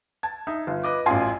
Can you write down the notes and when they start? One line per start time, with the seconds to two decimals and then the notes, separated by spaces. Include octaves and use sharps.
0.23 A5 G#6
0.47 D#4 E5
0.67 G1 F4
0.83 B4 D#5 D6
1.06 A1 F#2 F4 G#5 C6